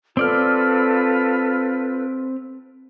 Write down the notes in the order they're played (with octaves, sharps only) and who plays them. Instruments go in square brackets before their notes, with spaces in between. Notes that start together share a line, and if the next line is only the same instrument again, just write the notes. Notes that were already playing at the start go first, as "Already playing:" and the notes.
[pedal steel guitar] C4 D5 F6 [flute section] F4 A4 B4